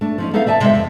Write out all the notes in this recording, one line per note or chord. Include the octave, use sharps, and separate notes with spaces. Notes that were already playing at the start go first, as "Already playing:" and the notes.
A3 D4
F3 C#4 D#4
B3 D#4 A4 B4 E5 F5
D#3 D5 E5 G#5 A5
C3 G#3 E5
F2